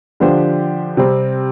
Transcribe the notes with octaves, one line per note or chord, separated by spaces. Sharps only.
D3 F3 D4 G4 C5
C3 G3 C4